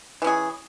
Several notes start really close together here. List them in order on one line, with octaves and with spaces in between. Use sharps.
E3 C#4 G#4